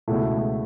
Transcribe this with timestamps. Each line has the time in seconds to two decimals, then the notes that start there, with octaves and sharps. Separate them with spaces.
0.08 C#2 B2 A3 E4